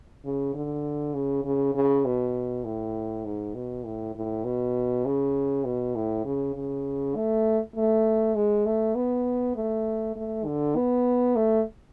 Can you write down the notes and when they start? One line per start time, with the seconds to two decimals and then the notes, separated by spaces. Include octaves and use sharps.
0.25 C#3
0.55 D3
1.14 C#3
1.45 C#3
1.75 C#3
2.05 B2
2.64 A2
3.25 G#2
3.55 B2
3.85 A2
4.15 A2
4.44 B2
5.05 C#3
5.65 B2
5.95 A2
6.25 C#3
6.55 C#3
7.16 A3
7.76 A3
8.35 G#3
8.66 A3
8.95 B3
9.56 A3
10.16 A3
10.46 D3
10.76 B3
11.36 A3